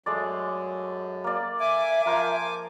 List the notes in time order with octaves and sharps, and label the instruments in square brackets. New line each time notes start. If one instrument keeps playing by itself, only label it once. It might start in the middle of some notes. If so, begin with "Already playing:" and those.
[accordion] F#2 [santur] G#3 A3 D5
[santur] A#3 D5
[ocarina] E5 [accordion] G#5 D6
[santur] F3 A#4 C5